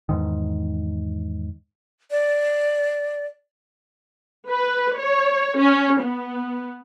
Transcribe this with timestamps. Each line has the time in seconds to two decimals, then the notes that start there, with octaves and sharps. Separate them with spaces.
0.09 E2 G#2 D#3
2.11 D5
4.48 B4
4.98 C#5
5.58 C#4
6.01 B3